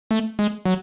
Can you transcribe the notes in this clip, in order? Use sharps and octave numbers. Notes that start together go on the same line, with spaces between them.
A3
G#3
F#3